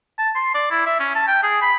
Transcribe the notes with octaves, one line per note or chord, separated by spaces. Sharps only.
A5
C6
D5
E4
E5
C#4
A5
G5
G#4
B5